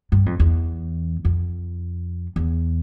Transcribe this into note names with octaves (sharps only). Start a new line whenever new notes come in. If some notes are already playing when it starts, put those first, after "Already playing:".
G2
F2
E2
F2
E2